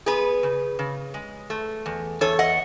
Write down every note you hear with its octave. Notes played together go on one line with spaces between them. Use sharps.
B3 G#4 B4
C#3
C#3
G#3
A3
E2
E2 A4 C#5
D#5 F#5